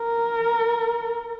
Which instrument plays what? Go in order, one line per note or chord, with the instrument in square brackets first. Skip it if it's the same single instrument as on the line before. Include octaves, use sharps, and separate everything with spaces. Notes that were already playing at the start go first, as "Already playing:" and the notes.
Already playing: [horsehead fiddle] A#4